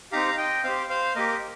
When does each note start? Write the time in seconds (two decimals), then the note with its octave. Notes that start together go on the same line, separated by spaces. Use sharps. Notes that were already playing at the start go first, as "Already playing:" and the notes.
0.12 C4 D#4 G4 F5 A#5
0.38 D#5 G5
0.64 C4 G4 C5 F5
0.90 C5 F5
1.16 A#3 G4 A#4 D#5